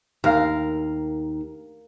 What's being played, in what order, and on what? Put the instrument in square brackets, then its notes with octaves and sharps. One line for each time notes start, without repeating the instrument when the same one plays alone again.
[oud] D#2 [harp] A#4 F5